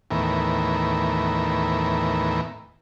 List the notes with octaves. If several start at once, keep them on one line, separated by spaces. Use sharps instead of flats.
D#2 A2 E3 B3 A#4